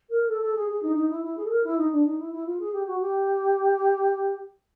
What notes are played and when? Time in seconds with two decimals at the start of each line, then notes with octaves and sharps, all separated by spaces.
0.09 A#4
0.28 A4
0.41 A4
0.54 G#4
0.69 G#4
0.82 D#4
0.95 D#4
1.09 E4
1.22 E4
1.36 G#4
1.44 A4
1.50 A#4
1.63 E4
1.77 D#4
1.91 D4
2.04 D#4
2.18 E4
2.32 E4
2.45 F4
2.59 G#4
2.72 G4
2.86 F#4
3.00 G4